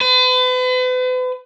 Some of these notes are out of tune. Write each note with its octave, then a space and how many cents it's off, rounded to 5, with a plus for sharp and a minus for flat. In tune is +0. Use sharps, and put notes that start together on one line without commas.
B4 +40